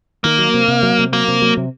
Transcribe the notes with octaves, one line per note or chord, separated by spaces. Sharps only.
D#3 A#3
F#3
C3
C3
F#3
C3
F#3 A#3
C3
F#3
C3